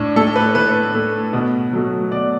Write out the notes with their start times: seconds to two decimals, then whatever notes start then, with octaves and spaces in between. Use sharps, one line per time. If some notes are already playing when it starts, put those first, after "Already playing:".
Already playing: A2 D4
0.16 A3 A4
0.36 B4
0.55 A2 B4
0.94 A3
1.33 B2
1.73 F#3 A3
2.11 B2 D5